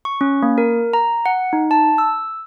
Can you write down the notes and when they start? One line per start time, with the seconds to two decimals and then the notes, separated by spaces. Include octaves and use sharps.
0.05 C#6
0.21 C#4
0.43 A#3
0.58 A#4
0.93 A#5
1.26 F#5
1.53 D#4
1.71 A5
1.98 E6